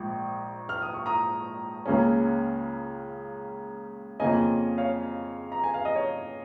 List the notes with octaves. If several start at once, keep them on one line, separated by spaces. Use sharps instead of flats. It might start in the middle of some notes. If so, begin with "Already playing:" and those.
Already playing: A#1 G#2 F3
F6
D#6
C#6
A#5 D#6
C#2 C#3 A#3 C#4
F2 C#3 A#3 C#4 D#5 G#5
C#5 F5
A#5
G#5
F5
D#5
C#5